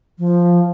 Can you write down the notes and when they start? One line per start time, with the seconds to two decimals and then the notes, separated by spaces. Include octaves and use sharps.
0.19 F3